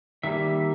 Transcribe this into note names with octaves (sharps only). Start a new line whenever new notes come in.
D#3 G3 A#3 E5